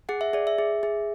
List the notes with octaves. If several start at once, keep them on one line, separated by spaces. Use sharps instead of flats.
G#4 F#5
E5
G#4 D5
E5
G#4
G#4